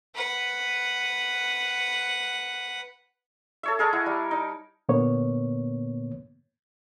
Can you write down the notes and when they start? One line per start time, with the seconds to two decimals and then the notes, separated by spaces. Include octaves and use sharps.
0.15 B4 F#5
3.63 A4 C#5 E5
3.79 G#4 A#4 D#5 A5
3.93 E4 F#5
4.06 G3
4.31 D#4
4.89 A#2 D3 A#3 B3 C#5